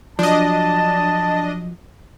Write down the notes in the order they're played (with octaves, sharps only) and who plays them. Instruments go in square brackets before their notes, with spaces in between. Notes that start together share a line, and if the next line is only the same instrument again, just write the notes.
[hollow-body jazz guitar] F3 F#3 [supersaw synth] D4 D#5 [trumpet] A5